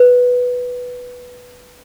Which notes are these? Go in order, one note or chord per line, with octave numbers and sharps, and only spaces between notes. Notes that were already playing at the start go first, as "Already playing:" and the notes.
Already playing: B4